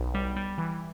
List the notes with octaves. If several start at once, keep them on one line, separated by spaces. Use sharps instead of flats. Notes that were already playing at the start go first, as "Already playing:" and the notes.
Already playing: B1
G3
G3
E3